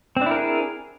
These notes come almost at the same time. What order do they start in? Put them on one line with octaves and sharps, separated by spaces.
C4 D4 E4 A#4 G#4